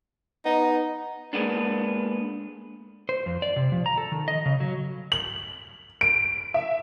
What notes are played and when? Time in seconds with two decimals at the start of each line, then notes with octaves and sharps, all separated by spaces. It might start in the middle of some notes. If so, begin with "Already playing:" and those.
0.45 B3 D#4
1.33 G#3 A#3 B3 D4
3.09 C5
3.26 F2
3.42 D5
3.56 C3
3.72 F3
3.86 A#5
3.98 A4
4.12 D#3
4.28 D#5
4.46 C#3
4.60 F#3
5.12 F#7
6.01 D7
6.54 E5